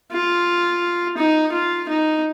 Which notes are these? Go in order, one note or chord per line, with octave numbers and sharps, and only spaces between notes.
F4
D#4
F4
D#4